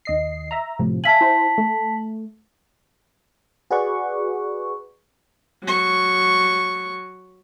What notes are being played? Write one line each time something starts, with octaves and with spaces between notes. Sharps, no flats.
D#2 D#5 C7
E5 A#5
A2 C3 F3
E5 F5 G#5 A5 B6 F#7
E4 C5
A3
F#4 G#4 B4 D5 F#5 C#6
F#3 C#6